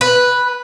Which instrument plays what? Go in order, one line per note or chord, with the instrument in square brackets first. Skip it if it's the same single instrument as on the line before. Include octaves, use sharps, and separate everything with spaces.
[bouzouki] B4